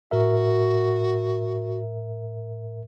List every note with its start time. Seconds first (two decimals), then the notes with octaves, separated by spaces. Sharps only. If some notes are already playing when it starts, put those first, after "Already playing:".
0.11 A2 F#4 A#4 E5